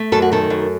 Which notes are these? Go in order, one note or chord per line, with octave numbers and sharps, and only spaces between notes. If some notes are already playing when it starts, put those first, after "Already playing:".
Already playing: A3
F#2 A4
F#4
D#3 A4
F#2